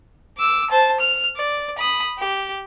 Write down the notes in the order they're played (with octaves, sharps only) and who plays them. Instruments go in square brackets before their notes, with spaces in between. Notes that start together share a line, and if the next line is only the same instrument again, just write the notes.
[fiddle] D6 E6
C5 A5
F6
D5
B5 D#6
G4